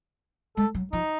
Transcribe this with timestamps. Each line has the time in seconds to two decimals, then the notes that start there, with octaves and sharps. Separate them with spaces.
0.57 G#3 A4
0.74 F#3
0.93 F3 D#4